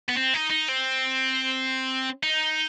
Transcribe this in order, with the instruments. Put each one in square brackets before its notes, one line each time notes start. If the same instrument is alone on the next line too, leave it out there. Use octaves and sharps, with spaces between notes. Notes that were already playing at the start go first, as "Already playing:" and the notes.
[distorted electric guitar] B3
C4
D#4
D#4
C4
D#4